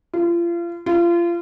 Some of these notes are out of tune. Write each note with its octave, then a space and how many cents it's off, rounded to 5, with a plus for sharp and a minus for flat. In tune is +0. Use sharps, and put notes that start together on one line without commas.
F4 -35
F4 -30